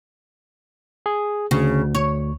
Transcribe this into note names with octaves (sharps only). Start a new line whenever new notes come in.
G#4
D2 C#3
C#5